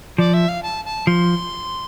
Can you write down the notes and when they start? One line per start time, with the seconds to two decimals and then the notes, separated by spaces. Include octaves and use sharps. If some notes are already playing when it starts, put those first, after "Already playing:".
0.18 F3 D5
0.34 E5
0.49 F5
0.63 A5
0.85 A5
1.07 F3 C6